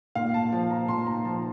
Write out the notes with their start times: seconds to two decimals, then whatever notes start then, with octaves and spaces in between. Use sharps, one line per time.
0.15 A#2 F5
0.34 A5
0.52 F3 A5
0.70 A#5
0.88 A#2 C6
1.07 A#5
1.25 F3 A5